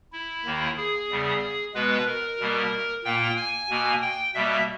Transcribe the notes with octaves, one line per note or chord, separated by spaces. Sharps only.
E4
D#2 D#3 A#3
G#4
E2 C#3 G3
B2 G#3 B3 B4
A#4
B2 G3 A#3
A#2 A#3 G5
G#5
B2 A#3
G5
B2 G3 A#3 E5